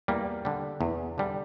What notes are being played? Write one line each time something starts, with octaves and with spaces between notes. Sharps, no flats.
E2 G3 A#3
D3 G3
E2
D3 G3